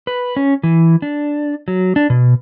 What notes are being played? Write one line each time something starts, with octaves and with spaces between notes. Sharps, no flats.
B4
C#4
E3
D4
F#3
D4
B2